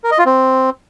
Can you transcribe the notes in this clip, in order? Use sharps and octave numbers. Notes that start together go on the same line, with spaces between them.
A#4
D#5
F4
C4